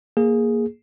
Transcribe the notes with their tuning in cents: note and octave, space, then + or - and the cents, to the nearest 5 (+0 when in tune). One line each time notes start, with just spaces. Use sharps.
A#3 +0 G#4 +0